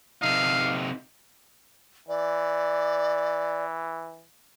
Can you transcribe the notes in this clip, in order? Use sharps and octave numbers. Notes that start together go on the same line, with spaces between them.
C3 D#4 F5
E3 D5